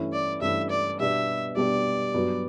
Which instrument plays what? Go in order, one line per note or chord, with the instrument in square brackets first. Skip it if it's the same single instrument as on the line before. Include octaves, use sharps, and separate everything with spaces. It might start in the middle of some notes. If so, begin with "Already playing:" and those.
Already playing: [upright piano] G2 E3 A3 C#4 E4
[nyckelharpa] D5
[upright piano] G2 E3 A3 C#4 E4 [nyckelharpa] E5
[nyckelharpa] D5
[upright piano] B2 G3 B3 D4 G4 [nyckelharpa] E5
[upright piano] B2 G3 B3 D4 G4 [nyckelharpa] D5
[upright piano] G2 F#3 B3 F#4